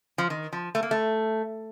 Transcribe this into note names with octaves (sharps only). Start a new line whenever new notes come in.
F3
D#3
F3
A3
A#3
A3